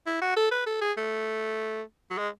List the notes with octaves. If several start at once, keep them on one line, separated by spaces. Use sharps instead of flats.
E4
F#4
A4
B4
A4
G#4
A3
F#3
G#3